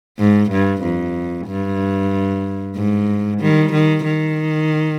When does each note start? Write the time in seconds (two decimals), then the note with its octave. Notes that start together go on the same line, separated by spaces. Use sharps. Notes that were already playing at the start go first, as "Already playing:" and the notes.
0.19 G#2
0.51 G2
0.83 F2
1.47 G2
2.75 G#2
3.40 D#3 G3
3.73 D#3
4.05 D#3